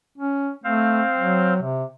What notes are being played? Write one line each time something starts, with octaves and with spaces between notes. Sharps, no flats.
C#4
A3 C4 C5 F5
F#3
C3